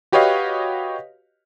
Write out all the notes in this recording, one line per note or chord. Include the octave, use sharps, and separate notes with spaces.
F#4 G4 B4 C#5 D#5 F5